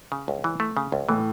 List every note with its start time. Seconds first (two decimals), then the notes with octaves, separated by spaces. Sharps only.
0.12 C#3
0.28 C#2
0.44 E3
0.60 A3
0.77 C#3
0.92 C#2
1.09 A2 E3